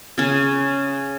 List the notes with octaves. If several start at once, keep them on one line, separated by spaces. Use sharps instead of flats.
C#3 C#4